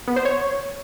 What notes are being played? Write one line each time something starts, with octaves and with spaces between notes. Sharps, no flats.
B3
C5
C#5